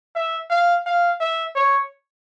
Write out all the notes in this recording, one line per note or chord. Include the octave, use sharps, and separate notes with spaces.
E5
F5
F5
E5
C#5